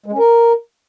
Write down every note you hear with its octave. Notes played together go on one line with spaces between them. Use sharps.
G#3
C#4
A#4